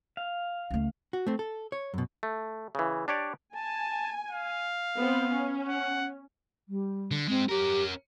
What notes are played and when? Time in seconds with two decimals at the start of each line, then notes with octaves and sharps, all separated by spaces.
0.17 F5
0.71 C#2 A3
1.13 F#4
1.27 A3 C4
1.39 A4
1.72 C#5
1.94 F#2 B2
2.23 A3
2.75 C#3 E3
3.08 D4 G4 C#5 D5
3.56 G#5 A5
4.31 F5
4.97 B3 C4
5.31 C#4
5.68 F#5
6.68 G3
7.11 D3
7.28 G#3 C4 D#4
7.49 C#4 G4 A#4